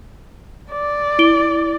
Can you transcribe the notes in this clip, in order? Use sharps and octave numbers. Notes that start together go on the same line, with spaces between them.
D5
E4 D7 G7